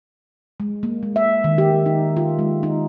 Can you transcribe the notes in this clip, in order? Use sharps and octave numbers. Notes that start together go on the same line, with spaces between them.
G#3
A#3
G#3
E5
D#3
G4
D#4
F4
G#3
D#4